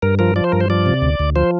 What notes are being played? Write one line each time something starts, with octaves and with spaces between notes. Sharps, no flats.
G2 A#4
F3 A#4
F3 D5
C5
G2 A#4
C5
F3 D5
C3
D2
D2
F3 C5